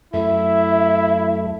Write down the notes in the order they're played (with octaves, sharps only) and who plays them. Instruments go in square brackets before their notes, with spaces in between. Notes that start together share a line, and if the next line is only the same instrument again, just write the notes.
[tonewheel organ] F#2 A3 [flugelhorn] E4 [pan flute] E5